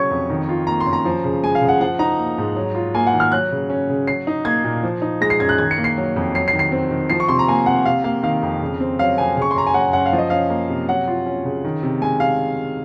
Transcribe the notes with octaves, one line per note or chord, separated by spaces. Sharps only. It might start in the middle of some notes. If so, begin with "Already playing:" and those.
Already playing: C#3 F#3 C#4 C#6 G#6
F2
D#3
F4
A#3 A#5
C6
F#2
A#5
F3
C#3
G#3 G#5
F5
C#3
F#5
F3 F#5
D#4 A#5
A#3
G#2
F#3
F4
A#3 G#5
F#5
D#3
F6
F#3 F#6
C#3
C#4
C#3
F#3 C7
D#4
A#3 G#6
A#2
F3
D#4
G#3 A#6
C7
F#2 G#6
F#6
D#3 G#6
C#7
A#3
C7
F#3
F2
F#3 C7
C7
D#3
C7
C4
D#3
F3 C7
C#6
C3 C6
A#5
A#3 G#5
C3 F#5
C3 F5
A#3 F5
D#3 F5
F2
C#3
C4
F#3 F5
F2 G#5
C#3
C#6
C6
F#2 A#5
G#5
F#3 F#5
F#2 F#5
F5
F3
D#5
C#4 F5
A#3
C3
F#3 F#5
F4
C#4
C#3
D#3
C3
G#3 G#5
C3 F5